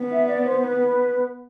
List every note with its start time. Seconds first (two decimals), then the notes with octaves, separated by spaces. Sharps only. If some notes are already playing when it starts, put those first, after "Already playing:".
Already playing: B3
0.10 E5
0.27 D5
0.44 C5
0.62 B4